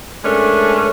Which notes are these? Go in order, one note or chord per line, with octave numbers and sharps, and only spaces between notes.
G#3 A3 C#4 D4 A#4